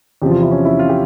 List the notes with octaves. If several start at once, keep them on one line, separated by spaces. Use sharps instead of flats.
E2 C3 F3 G4
F4
E4
C#4
E4
F4
G4